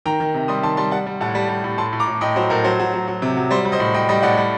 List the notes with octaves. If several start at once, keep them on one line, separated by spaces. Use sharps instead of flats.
D#3 G5 A#5
D#3
C3
G3 C6 D#6
D#3 A5 C6
G3 A5 C6
G3 F#5 A5
G3
A2 F#5 A5
G3
G3
A2
A2 A5 C6
A2
A#5 D6
A2
A2 D#5 G5
F#3 C5
A2 A#4
F#3 C5
F#3
F#3
F#3
C3
F#3
G3 C5
G3
C5 D#5
A2
G3 D#5 G5
G3 D#5 G5
A2 D5 F#5
G3